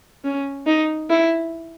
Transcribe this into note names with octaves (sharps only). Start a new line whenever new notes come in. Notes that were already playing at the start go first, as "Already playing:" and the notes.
C#4
D#4
E4